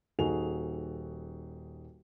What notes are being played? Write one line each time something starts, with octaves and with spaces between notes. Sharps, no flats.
D#1 D#4 F#4 G#4 A4 F7